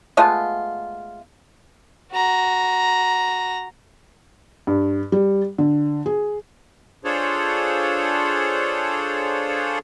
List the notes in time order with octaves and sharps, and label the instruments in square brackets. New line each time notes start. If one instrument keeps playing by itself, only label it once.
[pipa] G#3 A3 B3 F4
[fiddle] F#4 A#5
[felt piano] G2
G3
D3
G#4
[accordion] D4 F4 G#4 A4 C5 C#5